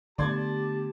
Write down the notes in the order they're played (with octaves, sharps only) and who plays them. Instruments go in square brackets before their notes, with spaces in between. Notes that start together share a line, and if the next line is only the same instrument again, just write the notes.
[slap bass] D3 A3 B3 [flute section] G4 [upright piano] D5 C6 G#6 [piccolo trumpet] A5